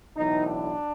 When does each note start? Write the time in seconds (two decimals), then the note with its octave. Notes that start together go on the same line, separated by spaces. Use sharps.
0.16 B1 A2 E3 D#4
0.45 D4